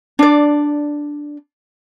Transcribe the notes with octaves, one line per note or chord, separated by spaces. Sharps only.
D4 D5